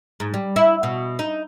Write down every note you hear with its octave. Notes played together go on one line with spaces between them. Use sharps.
G#2
G3
E4
B2
D#4